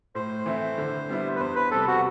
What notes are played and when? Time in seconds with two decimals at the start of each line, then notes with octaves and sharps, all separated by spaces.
0.15 A2 C5
0.46 E3 A3 C4 E4
0.78 D3
1.09 G3 B3 E4
1.36 B4
1.40 E2 C5
1.56 B4
1.71 C3 G3 C4 A4
1.87 F#4